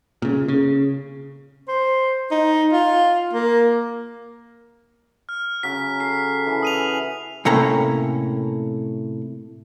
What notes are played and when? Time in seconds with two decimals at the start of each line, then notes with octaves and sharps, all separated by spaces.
0.22 A#2 C#3
0.48 C#3
1.68 C5
2.31 D#4
2.73 F4
3.33 A#3
5.29 F6
5.63 C#3 F#3 F6 B6
6.00 A4 B6 C7
6.47 E3 A5
6.63 A4 F#5 D#6 D#7 F7
7.45 A2 C3 A3 A#3 C#4 A#5